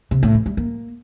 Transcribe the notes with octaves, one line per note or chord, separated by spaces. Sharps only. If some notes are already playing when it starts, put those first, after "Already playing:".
C3
A2
E3
G3
A#3